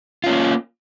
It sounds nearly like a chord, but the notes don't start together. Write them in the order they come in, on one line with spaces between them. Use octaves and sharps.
F4 C#4 A#3